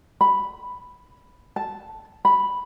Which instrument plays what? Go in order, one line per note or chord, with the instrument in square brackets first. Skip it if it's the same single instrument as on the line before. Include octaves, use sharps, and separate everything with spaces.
[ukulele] B5
A5
B5